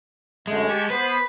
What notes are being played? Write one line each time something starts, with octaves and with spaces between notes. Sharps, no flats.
F#2 D3 G#3 A3
G4 A5 C#6
B3 B4 C5